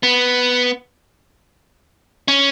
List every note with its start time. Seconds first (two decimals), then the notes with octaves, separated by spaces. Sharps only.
0.03 B3
2.28 C#4